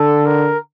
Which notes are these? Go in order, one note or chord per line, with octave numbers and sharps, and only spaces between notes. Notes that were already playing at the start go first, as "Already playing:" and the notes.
Already playing: D3 A4
A#4